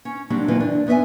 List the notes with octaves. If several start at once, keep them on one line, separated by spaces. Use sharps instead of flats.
C#4
F#3 G3 A#3 C4 D4
E2 B2 E3 F3 A#3 E4
D4
F#2 B3 D#4 E5 G#5